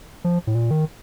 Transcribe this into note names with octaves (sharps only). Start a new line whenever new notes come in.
F3
A2
A#2
D#3